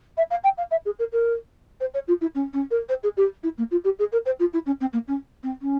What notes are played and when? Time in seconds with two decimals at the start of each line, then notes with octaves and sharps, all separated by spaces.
0.17 E5
0.31 F5
0.44 G5
0.58 F5
0.71 E5
0.85 G#4
0.99 A#4
1.13 A#4
1.80 C5
1.94 C#5
2.08 F4
2.21 E4
2.35 C#4
2.53 C#4
2.71 A#4
2.89 C5
3.03 G#4
3.17 G4
3.43 E4
3.58 A#3
3.71 F4
3.84 G4
3.99 G#4
4.12 A#4
4.26 C5
4.39 F4
4.53 E4
4.66 C#4
4.81 C4
4.93 A#3
5.08 C#4
5.43 C4
5.62 C#4